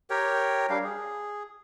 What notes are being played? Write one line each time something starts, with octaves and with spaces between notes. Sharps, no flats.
G4 A#4 C#5 G5
G3 D4 F5
G#4